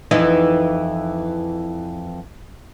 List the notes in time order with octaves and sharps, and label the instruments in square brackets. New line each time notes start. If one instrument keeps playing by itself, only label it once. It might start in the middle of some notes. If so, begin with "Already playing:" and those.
[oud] F2 E3 D#4